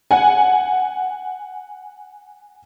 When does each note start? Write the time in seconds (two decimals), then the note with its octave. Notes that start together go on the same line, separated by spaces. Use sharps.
0.11 F#5 G#5